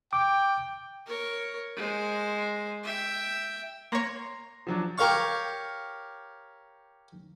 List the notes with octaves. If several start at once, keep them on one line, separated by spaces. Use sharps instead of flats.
G5 D6
A#4 C#5
G#3 C5
E5 G5
A#3 C#5 A#5 C6 A#6
F3 F#3 D4
G4 A#4 C#5 F5 C#6